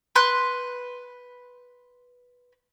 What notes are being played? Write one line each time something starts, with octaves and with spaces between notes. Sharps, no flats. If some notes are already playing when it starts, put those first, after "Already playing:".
B4 C6 F#6